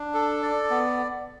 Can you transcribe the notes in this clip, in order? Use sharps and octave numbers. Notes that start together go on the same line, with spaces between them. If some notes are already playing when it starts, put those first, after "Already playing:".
Already playing: D4
A4
D5
B3